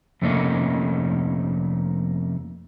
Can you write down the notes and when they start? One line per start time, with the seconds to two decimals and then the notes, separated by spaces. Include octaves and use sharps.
0.22 F2 C3 A3 A#3 C#4 D#4